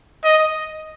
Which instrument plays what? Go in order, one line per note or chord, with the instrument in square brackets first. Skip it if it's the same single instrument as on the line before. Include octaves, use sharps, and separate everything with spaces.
[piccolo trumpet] D#5